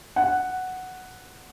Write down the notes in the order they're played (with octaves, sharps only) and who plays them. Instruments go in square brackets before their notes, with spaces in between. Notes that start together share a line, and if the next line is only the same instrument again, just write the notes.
[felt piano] F#5